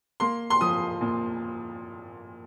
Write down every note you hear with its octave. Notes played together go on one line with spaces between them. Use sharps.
A#3 C6
C6
F3 D#6
A#2